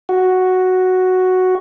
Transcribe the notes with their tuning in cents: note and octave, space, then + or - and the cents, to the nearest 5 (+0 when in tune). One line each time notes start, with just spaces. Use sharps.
F#4 +0